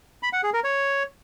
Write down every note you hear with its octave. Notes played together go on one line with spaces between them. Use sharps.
B5
F#5
G#4
A#4
C#5